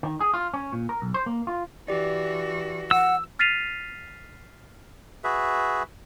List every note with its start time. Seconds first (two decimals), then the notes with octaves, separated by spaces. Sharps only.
0.03 D#3
0.20 G#4
0.34 F4
0.54 C#4
0.73 A#2
0.89 A#4
1.02 B1
1.14 C5
1.26 A#3
1.47 F4
1.88 E3 F#4 G4 D5
2.91 F#5 E6
3.39 F6 A6 B6 C7 D#7 F7
5.24 F#4 G#4 B4 E5